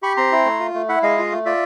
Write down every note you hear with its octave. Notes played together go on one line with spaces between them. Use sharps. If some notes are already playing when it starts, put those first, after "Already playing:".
G4 B5 C#6
C4 A#5 C6
E4
A3
F4
A3
E4 E5 F#5
G#3 D#5 F5
F4
A3
F4 D5 E5